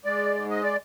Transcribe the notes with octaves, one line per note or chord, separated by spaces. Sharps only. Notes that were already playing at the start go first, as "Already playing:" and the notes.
G#3 D5
G#2
D#5
D5